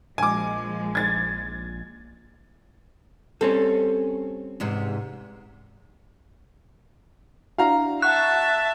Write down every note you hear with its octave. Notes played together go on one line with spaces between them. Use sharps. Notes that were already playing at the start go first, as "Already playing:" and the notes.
A#1 F3 G#3 G#5 D6
G#6 A6
G3 C4 C#4 A4
E2 G#2 C3
D4 E4 F#4 F5 A#5
E5 F#5 A5 C#6 F#6